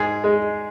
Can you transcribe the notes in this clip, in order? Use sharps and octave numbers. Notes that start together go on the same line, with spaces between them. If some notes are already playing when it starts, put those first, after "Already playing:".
Already playing: G#2 G#4
G#3